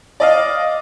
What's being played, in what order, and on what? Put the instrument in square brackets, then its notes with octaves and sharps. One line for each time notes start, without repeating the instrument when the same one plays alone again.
[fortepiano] D5 D#5 F5